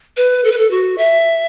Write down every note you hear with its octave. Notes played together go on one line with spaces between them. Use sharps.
B4
A4
B4
A4
F#4
E5